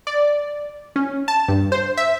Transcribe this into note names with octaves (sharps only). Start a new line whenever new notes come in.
D5
C#4
A5
G2
C5
E5